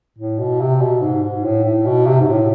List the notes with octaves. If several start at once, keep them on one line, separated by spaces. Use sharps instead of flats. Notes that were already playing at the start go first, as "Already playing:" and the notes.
A2
B2
C3
B2
G#2
G#2
A2
A2
B2
C3
G#2
A2